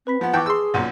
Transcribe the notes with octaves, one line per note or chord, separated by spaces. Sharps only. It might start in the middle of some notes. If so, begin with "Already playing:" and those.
C4 B4 B5 B6
F3 B3 F#5
E3 B3 G5 A5 C#6 D6
G#4 C6 E6
B1 F#2 A#2